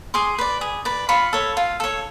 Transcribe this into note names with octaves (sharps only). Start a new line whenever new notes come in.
G#4 C6 D6
B4 D5
G#4
B4 D5
F4 B5 C#6
A4 C#5
F4
A4 C#5